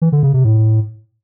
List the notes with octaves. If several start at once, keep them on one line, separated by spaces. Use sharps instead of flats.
E3
D3
C#3
C3
A2